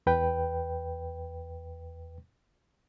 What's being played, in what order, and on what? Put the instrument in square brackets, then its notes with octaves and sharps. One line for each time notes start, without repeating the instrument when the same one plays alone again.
[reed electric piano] E2 B4 G5